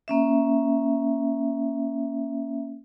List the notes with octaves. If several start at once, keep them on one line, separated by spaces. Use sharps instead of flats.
A#3 C#4 E5